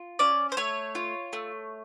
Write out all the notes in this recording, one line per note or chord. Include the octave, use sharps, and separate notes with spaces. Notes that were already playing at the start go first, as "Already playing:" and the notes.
Already playing: F4
C#4 D5
C5
A3 C#5
F4
A3